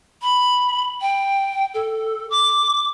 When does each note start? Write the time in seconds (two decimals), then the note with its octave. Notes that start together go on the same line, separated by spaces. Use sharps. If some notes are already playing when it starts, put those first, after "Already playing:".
0.23 B5
1.01 G5
1.74 A4
2.30 D6